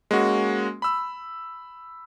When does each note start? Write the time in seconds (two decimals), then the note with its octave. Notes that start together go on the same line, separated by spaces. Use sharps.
0.11 G#3 A#3 C#4 F#4
0.82 B5 E6